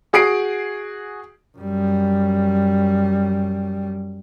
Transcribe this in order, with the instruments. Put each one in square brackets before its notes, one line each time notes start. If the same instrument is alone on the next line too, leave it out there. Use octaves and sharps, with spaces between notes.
[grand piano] F#4 G#4 D#6 C7 D7
[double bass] F#2 G3